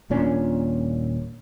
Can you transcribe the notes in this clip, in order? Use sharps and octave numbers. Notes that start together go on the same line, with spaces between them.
D#1 A#2 C#4 D4